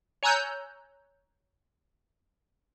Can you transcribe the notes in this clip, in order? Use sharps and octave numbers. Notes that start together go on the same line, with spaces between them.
C#5 G#5 A#5 E6 F#6 G6